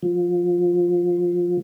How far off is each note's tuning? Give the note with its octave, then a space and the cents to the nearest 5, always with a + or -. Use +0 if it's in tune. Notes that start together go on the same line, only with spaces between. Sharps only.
F3 +10